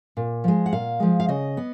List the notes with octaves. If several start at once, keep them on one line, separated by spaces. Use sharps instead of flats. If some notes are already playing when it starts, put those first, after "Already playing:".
A#2
F3 G#3
F#5
A#2 F5
F3 G#3
F5
C#3 D#5
B3